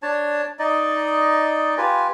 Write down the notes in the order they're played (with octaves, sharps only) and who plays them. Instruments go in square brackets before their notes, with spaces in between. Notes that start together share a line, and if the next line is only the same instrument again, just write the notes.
[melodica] D4 C#5 A5
D#4 D5 D#5
F4 G4 B4 G#5